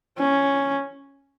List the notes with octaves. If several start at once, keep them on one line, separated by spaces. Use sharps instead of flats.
C#4